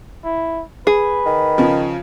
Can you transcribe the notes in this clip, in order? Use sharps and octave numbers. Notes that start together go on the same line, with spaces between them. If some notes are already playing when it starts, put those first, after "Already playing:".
E4
G#4 B4
D#3
C#3 F3